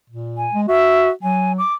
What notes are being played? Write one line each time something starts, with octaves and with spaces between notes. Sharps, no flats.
A#2
G#5
G#3
F#4 E5
F#3 G#5
D6